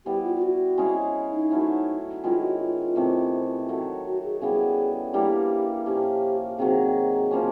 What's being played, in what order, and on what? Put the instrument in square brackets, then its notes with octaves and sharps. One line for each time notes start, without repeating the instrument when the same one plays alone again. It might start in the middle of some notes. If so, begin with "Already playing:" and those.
[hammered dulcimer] E3 G3 B3 [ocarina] G4
[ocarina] F4
F4
F#4
[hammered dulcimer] G#3 C#4 E4 G#4
[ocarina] D#4
[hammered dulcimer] F#3 A3 C#4 E4
[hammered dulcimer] D#3 G#3 C#4 E4 [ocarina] F4
[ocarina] F#4
F4
[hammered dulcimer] C3 E3 A3
D#3 F#3 A3
[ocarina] F#4
G#4
[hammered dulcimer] C#3 E3 G3 B3 [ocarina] G#4
[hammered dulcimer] E3 G3 A#3 D4 [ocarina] G4
[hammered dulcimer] A#2 F3 A#3 C#4 [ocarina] G4
[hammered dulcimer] C3 D#3 F#3 [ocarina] G#4
[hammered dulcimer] C#3 F3 A#3 C#4